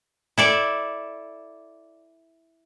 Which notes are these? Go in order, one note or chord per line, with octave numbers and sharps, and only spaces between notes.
E4 A4 D5